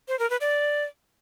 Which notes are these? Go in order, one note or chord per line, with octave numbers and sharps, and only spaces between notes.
C5
A#4
B4
D5